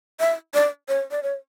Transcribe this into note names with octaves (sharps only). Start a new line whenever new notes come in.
E5
D5
C#5
D5
C#5